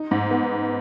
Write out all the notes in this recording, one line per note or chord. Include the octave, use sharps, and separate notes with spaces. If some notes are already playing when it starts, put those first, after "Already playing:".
Already playing: D#4
G#2
B3